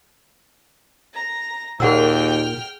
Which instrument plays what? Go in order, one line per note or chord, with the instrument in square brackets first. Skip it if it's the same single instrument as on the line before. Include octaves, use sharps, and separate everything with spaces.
[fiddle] A#5
[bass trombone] D#2 [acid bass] A#2 [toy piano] G#4 F#5 E6 [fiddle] G5 F6